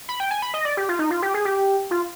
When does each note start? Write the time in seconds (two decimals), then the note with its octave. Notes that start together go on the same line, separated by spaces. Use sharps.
0.09 B5
0.20 G5
0.31 G#5
0.42 B5
0.54 D#5
0.65 D5
0.77 G4
0.89 F4
0.99 D#4
1.11 F4
1.22 G4
1.34 G#4
1.45 G4
1.91 F4